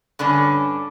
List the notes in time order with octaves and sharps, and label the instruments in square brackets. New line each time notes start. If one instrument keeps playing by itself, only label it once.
[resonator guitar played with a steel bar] G2 D3 C#4 D4